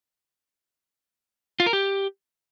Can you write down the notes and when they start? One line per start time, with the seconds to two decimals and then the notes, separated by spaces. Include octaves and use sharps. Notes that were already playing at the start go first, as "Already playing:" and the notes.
1.60 F4
1.66 A#4
1.73 G4